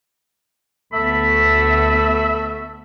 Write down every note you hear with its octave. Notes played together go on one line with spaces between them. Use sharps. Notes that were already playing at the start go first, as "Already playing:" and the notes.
D2 A3 B3 E5 B5